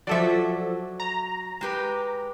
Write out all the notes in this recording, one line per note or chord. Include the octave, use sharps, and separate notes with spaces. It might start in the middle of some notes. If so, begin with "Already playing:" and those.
F3 F#3 F#4 A4 D5 E5
A#5
G#3 G4 B4